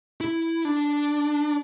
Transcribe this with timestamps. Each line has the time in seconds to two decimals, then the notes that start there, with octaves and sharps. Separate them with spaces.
0.21 E4
0.65 D4